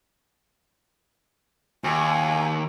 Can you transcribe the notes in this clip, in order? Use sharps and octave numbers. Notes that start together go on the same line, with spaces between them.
D#2 G#5